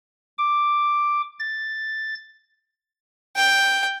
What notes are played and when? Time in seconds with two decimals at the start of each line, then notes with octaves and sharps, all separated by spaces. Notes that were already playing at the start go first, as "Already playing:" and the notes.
0.38 D6
1.39 A6
3.36 G5